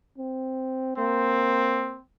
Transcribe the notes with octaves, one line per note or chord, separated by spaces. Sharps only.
C4
A#3 C4